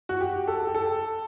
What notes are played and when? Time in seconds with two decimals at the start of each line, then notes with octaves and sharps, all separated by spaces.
0.09 F#4
0.21 G4
0.48 A4
0.67 G4
0.75 A4